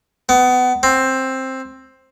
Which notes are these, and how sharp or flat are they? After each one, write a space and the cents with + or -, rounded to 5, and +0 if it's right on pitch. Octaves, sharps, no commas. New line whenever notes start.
B3 +25
C4 +10